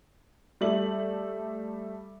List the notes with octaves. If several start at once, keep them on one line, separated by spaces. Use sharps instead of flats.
G3 A3 E5 F#7